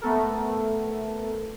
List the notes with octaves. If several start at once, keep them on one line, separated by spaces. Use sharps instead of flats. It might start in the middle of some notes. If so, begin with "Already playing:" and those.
A3 B3 A4 A#4